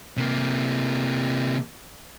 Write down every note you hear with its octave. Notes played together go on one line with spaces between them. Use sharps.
C3 A#3